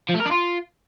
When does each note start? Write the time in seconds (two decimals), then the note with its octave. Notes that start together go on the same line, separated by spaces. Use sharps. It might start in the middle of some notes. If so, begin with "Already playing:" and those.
0.09 F3
0.14 A3
0.20 A#4
0.25 D4
0.31 F4